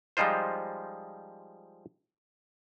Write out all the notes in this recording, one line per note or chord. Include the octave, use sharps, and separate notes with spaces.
F3 G3 G#3 D#4 F4 C5